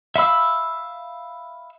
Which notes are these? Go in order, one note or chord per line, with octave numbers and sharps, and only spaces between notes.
E5 F5 B5 E6